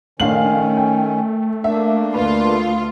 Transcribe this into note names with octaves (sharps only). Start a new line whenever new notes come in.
A#1 D#3 A3 C#4 F5 F#7
G5
A#3 D4 E5
D2 F4 B4